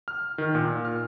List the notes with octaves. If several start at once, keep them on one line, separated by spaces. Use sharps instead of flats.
F6
D#3
A#2
F6